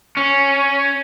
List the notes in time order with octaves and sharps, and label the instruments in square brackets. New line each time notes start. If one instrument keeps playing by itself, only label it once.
[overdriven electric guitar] C#4